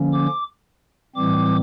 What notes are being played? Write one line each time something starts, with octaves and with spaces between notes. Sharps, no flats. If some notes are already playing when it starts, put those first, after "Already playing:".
Already playing: D3 F3 A#3 C#4
D6
A2 E3 G3 C4 D6